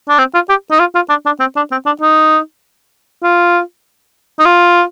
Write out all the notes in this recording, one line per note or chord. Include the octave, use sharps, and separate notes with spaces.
D4
C4
F4
G4
D#4
F4
F4
D4
D4
C4
D4
C4
D4
D#4
F4
D#4
F4